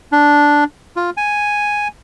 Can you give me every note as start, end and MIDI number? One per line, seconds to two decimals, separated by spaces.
0.12 0.64 62
0.96 1.10 65
1.17 1.88 80